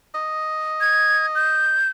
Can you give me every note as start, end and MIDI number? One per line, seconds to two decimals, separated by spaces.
0.15 1.80 75
0.81 1.27 92
1.35 1.88 91